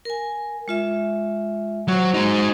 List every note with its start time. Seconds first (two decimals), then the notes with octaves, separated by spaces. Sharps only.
0.05 A#4 G#5
0.68 G#3 F4 E5
1.88 F#3 F#4 C5
2.14 G#3 D#4